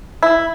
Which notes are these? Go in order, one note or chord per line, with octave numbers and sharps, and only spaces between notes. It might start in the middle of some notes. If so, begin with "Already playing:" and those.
E4